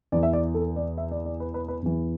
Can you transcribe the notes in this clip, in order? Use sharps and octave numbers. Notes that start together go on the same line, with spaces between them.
E2 E3 D5
E5
D5
A4
D5
E5
D5
D5
B4
B4
B4
E2 E3